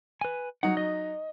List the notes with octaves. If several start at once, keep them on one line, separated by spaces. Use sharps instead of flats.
B4 G#5
F#3 D#4 F#5
D#5